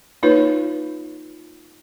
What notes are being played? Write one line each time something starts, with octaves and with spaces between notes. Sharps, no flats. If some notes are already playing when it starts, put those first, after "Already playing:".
A#3 D#4 F4 B4 C#5